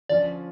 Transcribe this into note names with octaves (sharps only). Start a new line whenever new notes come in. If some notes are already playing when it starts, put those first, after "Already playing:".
D3 F3 C#4 F4 D5